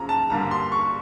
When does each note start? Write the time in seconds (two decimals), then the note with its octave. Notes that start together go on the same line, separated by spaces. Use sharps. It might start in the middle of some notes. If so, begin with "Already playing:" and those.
Already playing: F#2 C#3 F3 A#3 A#5
0.09 A5
0.30 G2 D3 G3 A#3 A#5
0.51 C6
0.72 C#6